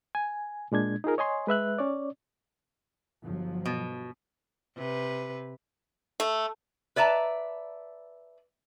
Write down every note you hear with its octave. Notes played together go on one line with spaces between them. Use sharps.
G#5
A#2 G#3 D4 G#6
D#4 F4 G#4 A#4
C#5 D#5 G#5 C6
G#3 B4 E5 F#6
C#4 C#5 D5
G1 F3 F#3
B2
C3 B4
A3
B4 D5 E5 A5 A#5